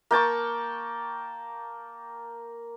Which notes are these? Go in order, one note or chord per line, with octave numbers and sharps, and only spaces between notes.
A#3 G5 A5 C#6